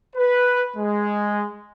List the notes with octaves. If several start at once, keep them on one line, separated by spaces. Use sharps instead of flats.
B4
G#3